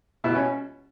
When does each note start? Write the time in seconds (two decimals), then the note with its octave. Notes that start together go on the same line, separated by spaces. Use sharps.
0.24 B2 E4
0.35 C#4